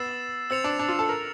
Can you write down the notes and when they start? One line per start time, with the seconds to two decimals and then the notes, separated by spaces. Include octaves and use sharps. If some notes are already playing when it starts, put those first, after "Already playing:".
Already playing: B3 E6 A6 C7 E7
0.50 C4 E6 A6 C#7 F7
0.64 D4
0.79 D4
0.89 F4
0.99 A4
1.09 A#4